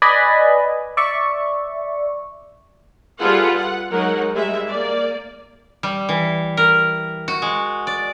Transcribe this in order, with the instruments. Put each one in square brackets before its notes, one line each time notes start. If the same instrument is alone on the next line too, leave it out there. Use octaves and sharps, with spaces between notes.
[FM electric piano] B4 D5 D#5 G#5 B5
D5 E5 C#6
[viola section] G3 F4 G#4 A4 B4 F#5
F#5
F#3 G#3 D#4 A#4 F#5
G3 G#3 E5
A#3 D5
[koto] G3
E3
A#4
F#4
G#3
D5